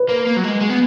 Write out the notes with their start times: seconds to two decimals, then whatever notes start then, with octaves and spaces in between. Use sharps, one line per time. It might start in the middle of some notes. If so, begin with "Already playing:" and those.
Already playing: B4
0.09 A#3
0.26 A#3
0.36 F#3
0.44 G#3
0.61 G#3
0.69 B3